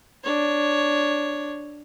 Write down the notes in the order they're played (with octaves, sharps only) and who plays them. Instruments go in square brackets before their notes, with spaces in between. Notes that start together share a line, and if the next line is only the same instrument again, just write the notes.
[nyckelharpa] D4 C#5